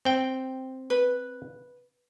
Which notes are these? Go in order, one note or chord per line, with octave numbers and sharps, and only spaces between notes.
C4 G5
B4